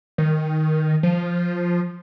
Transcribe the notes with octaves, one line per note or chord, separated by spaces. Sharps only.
D#3
F3